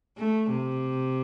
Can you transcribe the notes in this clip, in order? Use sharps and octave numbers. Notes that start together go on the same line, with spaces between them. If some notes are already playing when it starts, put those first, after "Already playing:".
A3
C3